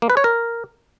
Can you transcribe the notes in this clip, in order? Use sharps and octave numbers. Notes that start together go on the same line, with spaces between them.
A#3
B4
C#5
A#4